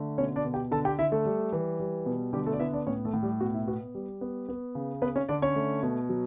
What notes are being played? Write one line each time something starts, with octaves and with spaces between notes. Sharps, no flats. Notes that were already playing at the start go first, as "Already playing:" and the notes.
Already playing: D3 A3
B2 C#4 C#5
D4 D5
B2
G4 G5
D3 A4 A5
G4 G5
D3 E4 E5
A3 A4
G3
E3
G3
B2
D3 G3 G4
A3 A4
D5
B3 E4 E5
D4 D5
A2 C#4 C#5
A3 A4
A2
G3 G4
B2 F#4
E4
B3 F#4
G3
B3
B3
C#3
B3 B4
C#4 C#5
D3 D4 D5
C#4 C#5
A3
B2
F#3